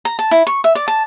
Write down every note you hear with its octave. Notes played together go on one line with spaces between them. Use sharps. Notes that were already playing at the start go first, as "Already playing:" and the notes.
A#5
A5
E4
C#6
E5
D5
A5